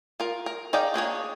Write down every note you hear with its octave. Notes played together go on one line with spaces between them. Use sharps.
F4 A#4
A#4
D#4 G#4 D5 F5 G5
A#3 D4 G#4 C#5